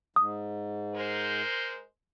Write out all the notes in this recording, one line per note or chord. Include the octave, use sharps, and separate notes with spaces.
G#2 D#6
G#3 A#4 C5